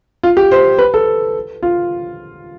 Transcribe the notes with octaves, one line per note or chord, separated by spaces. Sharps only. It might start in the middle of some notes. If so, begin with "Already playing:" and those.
F4
G4
C5
B4
A4
F4